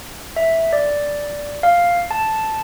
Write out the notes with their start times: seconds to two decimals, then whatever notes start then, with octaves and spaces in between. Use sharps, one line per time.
0.36 E5
0.73 D5
1.63 F5
2.11 A5